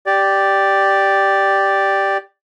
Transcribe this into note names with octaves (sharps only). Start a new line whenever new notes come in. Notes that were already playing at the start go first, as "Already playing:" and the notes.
G4 D5